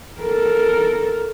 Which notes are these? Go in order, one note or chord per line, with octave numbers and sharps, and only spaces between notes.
A4 A#4